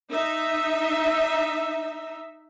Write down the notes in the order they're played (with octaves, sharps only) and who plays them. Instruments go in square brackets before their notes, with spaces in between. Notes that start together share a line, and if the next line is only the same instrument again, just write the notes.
[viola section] D#4 E5